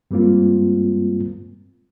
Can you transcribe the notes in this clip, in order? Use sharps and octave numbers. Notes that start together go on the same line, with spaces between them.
G2 G3 G#3 A#3 C4 F4